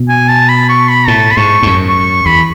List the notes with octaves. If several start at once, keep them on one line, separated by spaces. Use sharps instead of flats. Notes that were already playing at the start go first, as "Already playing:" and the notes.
Already playing: B2
G#5
A5
B5
C#6
B5
A2 A5
B5
G#2 C#6
G#2
F#2 C#6
C#6
E2 B5